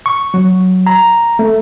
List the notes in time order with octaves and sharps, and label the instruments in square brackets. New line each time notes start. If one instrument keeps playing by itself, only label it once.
[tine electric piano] C#6
F#3
A#5
A3